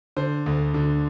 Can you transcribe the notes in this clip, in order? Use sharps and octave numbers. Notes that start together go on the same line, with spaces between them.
D3 C5
D2
D3